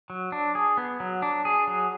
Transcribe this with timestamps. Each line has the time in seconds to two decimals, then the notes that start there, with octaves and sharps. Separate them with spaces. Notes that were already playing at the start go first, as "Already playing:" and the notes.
0.10 F#3
0.32 D4
0.55 G#4
0.77 B3
1.00 F#3
1.22 D4
1.45 G#4
1.67 F#3